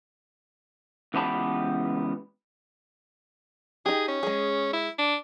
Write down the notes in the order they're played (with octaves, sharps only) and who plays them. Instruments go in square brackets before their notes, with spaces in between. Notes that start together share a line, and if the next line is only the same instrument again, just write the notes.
[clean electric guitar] C#2 E3 B3 G4 A5 B5
[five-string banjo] D#4 G4 [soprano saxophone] G#4
[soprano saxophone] C#4
[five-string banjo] G#3 G#4
[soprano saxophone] E4
D4